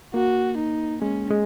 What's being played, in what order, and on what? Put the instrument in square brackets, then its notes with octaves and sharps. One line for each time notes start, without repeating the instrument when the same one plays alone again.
[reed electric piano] A#3 [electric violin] F#4
[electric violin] D#4
[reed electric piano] G#3 [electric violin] C#4
[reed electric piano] G#3